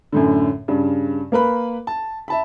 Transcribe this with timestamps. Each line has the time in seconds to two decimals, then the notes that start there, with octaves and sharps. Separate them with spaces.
0.12 F#2 A2 D3
0.68 G2 C#3
1.32 A#3 A#4 B4 B5
1.87 A5
2.28 E5 A5 B5